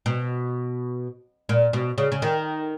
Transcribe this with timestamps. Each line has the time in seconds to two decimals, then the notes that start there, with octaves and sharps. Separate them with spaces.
0.06 B2
1.49 A#2
1.73 B2
1.98 C#3
2.12 C#3
2.22 D#3